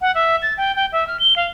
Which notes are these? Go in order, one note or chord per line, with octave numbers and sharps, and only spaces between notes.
F#5
E5
A6
G5
G5
E5
F6
G7
F5